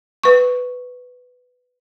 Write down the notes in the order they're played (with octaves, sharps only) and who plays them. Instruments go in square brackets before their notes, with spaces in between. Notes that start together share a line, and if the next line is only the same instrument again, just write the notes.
[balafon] B4 C#6